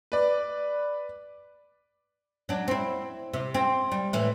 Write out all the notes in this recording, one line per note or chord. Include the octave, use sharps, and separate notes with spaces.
B4 D5
F#3 D4
C4 E4
C3
C4
G3
A2 E3